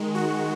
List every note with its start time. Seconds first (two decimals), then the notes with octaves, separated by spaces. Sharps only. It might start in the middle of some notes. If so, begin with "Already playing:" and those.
Already playing: D#3 G#3
0.15 F#4